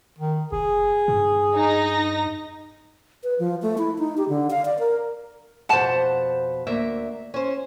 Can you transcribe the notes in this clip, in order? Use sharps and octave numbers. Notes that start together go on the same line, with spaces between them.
D#3
F1 G#4
G2
D#4 A#6
B4
F3
A3
E4
D#4
G4
D3
F5
D5
A#4
F2 B2 C5 F#5 A5
D2 A#3 E5
C#4 C5